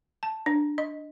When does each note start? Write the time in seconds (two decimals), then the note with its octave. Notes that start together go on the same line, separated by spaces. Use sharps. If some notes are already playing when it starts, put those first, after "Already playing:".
0.23 A5
0.46 D4
0.78 D#5